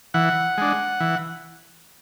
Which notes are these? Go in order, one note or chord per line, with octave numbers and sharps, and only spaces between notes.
E3 F#5
G#3 D4
E3